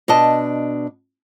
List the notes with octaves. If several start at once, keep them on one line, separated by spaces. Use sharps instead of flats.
B2 D4 D#5 A5